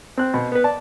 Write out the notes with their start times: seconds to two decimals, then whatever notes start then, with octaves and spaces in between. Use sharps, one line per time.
0.17 C4 F#6
0.34 B2
0.52 B3 B4
0.64 D5 A5